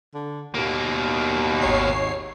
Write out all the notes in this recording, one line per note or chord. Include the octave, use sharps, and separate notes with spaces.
D3
D#2 B2 A#3
G#1 C#5 C7